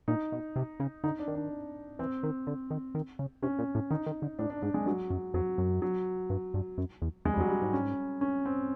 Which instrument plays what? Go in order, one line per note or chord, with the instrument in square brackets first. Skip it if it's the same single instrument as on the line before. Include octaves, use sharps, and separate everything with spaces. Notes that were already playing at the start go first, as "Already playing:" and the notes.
[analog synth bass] A#2 [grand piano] D#4
[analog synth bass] B2
C3
C#3
[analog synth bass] D3 [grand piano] D#4
[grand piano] D4
[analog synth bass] D#3
[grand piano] D4
[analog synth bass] E3 [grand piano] C4
[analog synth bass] D#3
D3
D#3
D#3
C#3
[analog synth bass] C3 [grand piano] C#4
[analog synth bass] A#2
A2
[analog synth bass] D#3 [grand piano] D#4
[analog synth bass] D#3
D3
[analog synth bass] A2 [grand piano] D4
[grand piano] D4
[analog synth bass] G#2 [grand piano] D4
[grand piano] G#3
[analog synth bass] G2 [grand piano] F#3
[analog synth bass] F#2
[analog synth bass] F2 [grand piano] F#3
[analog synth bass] F#2
[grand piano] F#3
[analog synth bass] G2
G2
F#2
E2
[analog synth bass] E2 [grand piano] G#3
[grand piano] G3
[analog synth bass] F2
[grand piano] F#3
[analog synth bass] G2 [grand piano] G3
[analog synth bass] G#2
[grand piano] C#4
C#4
C4